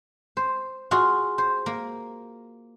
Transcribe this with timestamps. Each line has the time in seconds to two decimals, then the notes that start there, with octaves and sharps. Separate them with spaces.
0.37 C5
0.91 F4 F#4 G#4
1.38 C5
1.66 A#3